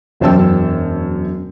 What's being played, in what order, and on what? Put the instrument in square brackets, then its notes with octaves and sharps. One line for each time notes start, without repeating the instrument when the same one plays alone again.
[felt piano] E1 F#2 C5 G5 A5 E6